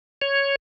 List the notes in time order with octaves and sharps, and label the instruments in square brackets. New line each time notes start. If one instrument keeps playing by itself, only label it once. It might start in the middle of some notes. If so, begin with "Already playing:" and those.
[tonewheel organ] C#5